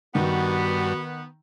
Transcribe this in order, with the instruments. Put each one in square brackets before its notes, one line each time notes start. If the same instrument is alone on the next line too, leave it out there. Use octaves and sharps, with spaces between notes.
[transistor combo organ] G2 [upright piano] D#3 [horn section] B3 [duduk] F#4